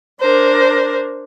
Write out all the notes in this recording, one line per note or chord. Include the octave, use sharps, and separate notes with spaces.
D4 A#4 C5